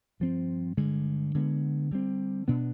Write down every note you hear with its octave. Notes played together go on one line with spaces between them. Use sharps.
G2 F3 C4
G2 D3 G#3
D3 G#3 B3
D3 G3 C4
B2 B3 D4